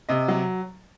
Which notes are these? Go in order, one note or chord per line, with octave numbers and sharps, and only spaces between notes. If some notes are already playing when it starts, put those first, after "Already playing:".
C3 D#5
F#3